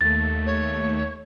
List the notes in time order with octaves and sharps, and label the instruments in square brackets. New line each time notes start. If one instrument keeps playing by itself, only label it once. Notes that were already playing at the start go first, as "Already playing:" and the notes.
[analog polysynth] D#2 A3 [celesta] A6
[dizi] C#5